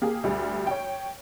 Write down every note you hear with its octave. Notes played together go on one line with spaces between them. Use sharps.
A#3 G4 G#4
D2 G3
C#5 G5